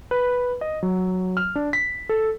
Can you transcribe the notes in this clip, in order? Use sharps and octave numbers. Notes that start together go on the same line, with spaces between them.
B4
D#5
F#3
F6
D4
B6
A4